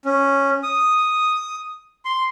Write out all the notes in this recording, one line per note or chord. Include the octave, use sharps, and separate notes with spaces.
C#4
D#6
C6